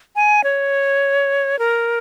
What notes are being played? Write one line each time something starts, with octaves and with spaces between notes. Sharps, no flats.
G#5
C#5
A#4